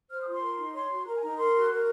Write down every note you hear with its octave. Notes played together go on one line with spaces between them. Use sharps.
C5 F6
D#6
F4 C6
A#4
D#4
C#5 C6
F#4
A#4 A#5
G#5
D#4 A#5
A#4 C6
F#4
A#4